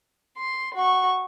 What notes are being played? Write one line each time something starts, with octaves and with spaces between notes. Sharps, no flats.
C6
F#4 C#6